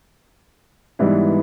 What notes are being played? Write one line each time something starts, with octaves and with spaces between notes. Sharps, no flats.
G#2 E3 G3 B3 E4